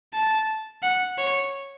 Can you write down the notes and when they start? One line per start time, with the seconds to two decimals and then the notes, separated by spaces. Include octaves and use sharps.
0.13 A5
0.83 F#5
1.18 C#5